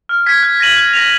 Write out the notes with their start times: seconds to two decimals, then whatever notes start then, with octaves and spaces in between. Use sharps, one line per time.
0.09 F6
0.26 G#6 B6
0.43 F#6
0.60 A#6 D#7 F#7
0.76 F#6
0.93 A#6 F7